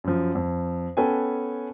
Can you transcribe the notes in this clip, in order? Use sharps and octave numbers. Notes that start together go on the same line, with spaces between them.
F#2 F3
F2
B3 C#4 A4 B4 G5 G#5